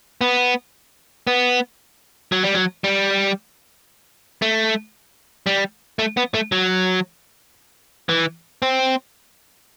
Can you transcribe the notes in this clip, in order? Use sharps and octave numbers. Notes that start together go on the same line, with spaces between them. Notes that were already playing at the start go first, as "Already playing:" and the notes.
B3
B3
F#3
G3
F#3
G3
A3
G3
A3
B3
A3
F#3
E3
C4